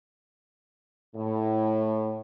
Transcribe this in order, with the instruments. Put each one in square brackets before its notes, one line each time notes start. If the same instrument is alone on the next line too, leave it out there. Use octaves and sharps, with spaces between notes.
[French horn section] A2